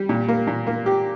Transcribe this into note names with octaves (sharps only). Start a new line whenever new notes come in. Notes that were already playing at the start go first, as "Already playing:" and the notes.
Already playing: G3
A#2
A#3
A#2
A#3
G4